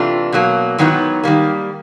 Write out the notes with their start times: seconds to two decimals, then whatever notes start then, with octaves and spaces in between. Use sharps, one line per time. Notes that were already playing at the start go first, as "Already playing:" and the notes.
Already playing: C3 E3 A3 D4 F4
0.32 B2 F#3 A#3
0.78 G#2 D#3 F#3 B3 E4
1.23 D#3 G3 A#3